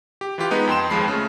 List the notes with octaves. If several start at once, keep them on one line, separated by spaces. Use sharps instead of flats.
G4
E3 F4 G4
G#3 B3 D#4 B4
F2 G5 C6 E7
D#2 F3 G#3 B5 C7
C#3 A3